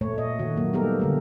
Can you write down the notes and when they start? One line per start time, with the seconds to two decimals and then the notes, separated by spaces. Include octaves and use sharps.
0.01 A#2 A3 C#5
0.14 A#2 D#5
0.39 D#3 F#4
0.56 F#3 A#3
0.73 G3 B3 D#4 G4 A4 A#4
1.00 D3 A3 A#3